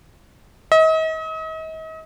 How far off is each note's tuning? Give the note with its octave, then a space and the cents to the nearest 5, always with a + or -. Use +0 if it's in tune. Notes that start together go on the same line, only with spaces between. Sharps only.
D#5 +40